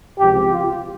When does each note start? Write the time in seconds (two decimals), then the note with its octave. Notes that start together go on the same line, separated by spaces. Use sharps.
0.18 C#2 C3 F3 G4
0.50 F4